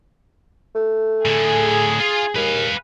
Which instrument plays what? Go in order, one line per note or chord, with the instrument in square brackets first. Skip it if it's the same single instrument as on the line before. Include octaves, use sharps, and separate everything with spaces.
[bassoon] A3
[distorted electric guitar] A2 D3 [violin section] G#4
[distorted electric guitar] F4
[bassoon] D#2 [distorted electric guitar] B4 F5